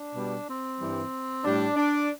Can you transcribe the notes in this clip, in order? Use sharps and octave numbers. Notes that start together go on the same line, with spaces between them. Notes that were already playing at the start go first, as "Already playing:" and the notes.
Already playing: D4
B2 G3
C4
G2 E3 G3
A2 G3 D4
D4